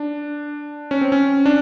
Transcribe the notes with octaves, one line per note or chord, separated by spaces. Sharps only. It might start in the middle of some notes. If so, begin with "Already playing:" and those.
Already playing: D4
C#4
C4
C#4
D4